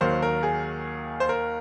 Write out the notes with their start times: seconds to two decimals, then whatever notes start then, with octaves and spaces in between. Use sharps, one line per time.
0.01 D#2 D#3 F#3 A#3 C5
0.22 A#4
0.43 G#4
1.20 C5
1.29 A#4